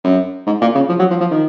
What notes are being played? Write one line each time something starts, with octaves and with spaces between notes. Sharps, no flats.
F#2
G#2
A#2
C#3
F3
F#3
F3
F3
D#3